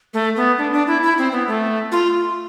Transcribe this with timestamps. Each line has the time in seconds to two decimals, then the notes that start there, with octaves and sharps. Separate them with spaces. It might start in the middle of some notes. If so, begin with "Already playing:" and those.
0.14 A3
0.36 B3
0.58 D4
0.73 D4
0.87 E4
1.03 E4
1.18 C4
1.32 B3
1.48 A3
1.92 F4